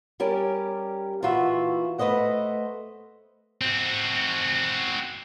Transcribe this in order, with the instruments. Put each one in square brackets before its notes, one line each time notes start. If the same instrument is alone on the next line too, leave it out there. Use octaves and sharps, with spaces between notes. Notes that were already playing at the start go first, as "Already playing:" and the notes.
[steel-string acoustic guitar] G3 C#4 G4 A#4 D5
A#2 E3 F4 F#4 E5
A3 B4 C5 D#5 F#5
[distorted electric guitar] C4 F#4